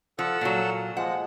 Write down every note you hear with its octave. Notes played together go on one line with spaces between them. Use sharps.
F3 A4 F#5 E6
A#2 F#3
F3 G#3 F#5